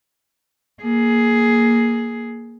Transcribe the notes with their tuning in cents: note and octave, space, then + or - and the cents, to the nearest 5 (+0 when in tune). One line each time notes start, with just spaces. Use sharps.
A#3 +0 G#4 +10